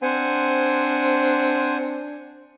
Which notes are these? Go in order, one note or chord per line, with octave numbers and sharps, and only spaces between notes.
C4 D4 C5 F#5 G#5